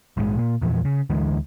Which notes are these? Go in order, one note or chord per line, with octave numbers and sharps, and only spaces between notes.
A#1 G#2 B2 G#3
A#2 A#3
E2 A#2 E3 F3
C#3
D2 D3 E3 G#3